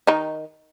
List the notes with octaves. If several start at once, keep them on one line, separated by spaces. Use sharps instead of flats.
D#3 D#4